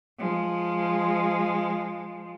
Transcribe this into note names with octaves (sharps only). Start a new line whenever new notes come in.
F3 G#3